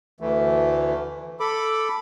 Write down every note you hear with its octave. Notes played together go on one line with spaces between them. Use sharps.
D2 E3 A3
A4 B5 D6